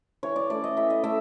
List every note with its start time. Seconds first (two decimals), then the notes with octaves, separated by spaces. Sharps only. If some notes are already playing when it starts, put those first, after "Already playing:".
0.23 E3 C#5
0.36 D5
0.50 A3 C#4 D5
0.64 D#5
0.77 E3 E5
0.90 D#5
1.03 A3 E5